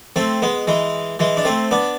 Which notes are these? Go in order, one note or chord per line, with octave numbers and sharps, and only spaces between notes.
A3 C4
G#3 B3
E3 G#3
E3 G#3
D4
A3 C4
B3 D4